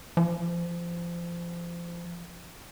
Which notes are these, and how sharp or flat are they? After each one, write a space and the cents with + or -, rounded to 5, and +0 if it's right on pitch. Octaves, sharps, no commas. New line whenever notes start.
F3 -25